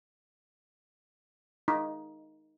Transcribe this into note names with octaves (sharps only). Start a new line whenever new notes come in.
D#4